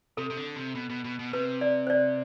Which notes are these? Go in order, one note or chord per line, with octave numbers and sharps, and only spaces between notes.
C3 A4
C3
D3
C3
B2
B2
B2
B2
C3 B4
D5
C5
D5